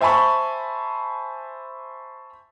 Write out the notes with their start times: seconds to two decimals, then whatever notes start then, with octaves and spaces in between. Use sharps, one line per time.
0.01 C5 E5 G#5 A5 B5 C#6